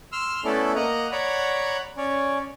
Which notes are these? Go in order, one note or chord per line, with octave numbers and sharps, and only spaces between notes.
C6 E6 F6
A3 B3 C#4 E4 A4 D5
A#3 D#5 F#5 A#5
C#5 D5 F#5 A#5 B5
C#4 C#5 D5